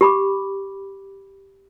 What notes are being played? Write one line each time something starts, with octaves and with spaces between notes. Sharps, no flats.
G4 B5 D6